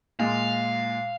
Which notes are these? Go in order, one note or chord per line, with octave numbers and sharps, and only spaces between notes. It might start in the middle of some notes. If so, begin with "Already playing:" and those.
A#2 G#3 F5